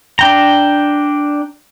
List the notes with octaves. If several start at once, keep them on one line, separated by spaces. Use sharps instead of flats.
D4 G5 A#5